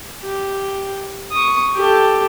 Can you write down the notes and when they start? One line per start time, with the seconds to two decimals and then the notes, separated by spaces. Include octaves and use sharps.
0.23 G4
1.32 C#6 D#6
1.76 G4 A4